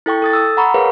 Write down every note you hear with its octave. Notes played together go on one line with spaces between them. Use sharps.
E4 A4 G5 C#6
A4 D#6 A6
D#6 E6
F#5 A#5 B5 C#6
G#4 A#4 B4 C#5 F5